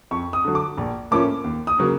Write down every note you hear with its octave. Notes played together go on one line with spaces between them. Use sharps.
F2 C#6
D#6
D3 F#3
D6
A#1
A2 F3 A#3 C#4 D6
D#2
D#6
C#3 F#3 A#3